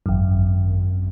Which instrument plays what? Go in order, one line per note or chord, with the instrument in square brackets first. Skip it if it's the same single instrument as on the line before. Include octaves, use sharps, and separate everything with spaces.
[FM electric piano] G#1 F#2